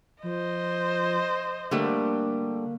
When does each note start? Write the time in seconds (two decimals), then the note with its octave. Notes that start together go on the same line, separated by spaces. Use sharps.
0.23 F3 C5 D#5
1.71 D3 G3 A3 A#3